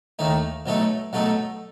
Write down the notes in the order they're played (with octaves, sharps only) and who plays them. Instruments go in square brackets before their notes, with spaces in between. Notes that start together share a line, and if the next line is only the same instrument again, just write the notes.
[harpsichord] D#2 D#3 A3 D#4
B2 F#3 A3 D#4 A4
B2 F#3 A3 D#4 A4